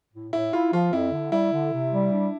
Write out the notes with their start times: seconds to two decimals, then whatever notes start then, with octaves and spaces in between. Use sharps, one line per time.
0.13 A2
0.33 A2 E4
0.53 E4 F4
0.73 F3 F4
0.92 F2 E4
1.12 D3
1.32 G3 E4
1.53 D3
1.72 C3
1.92 G3
2.12 D4